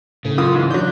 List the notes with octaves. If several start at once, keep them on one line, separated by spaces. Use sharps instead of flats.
A2 C#3
F#2 F4 D#6
G#2 E3
F#3 D4 G6